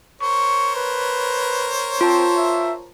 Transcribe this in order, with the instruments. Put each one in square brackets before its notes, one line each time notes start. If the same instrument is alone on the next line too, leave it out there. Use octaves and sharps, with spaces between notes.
[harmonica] A#4 C5 C#5 [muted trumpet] C#6
[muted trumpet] B4
[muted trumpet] C4 [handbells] F4 A5
[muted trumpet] E5